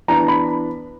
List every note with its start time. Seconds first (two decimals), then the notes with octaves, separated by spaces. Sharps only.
0.08 E3 B3 D4 A#5
0.28 B5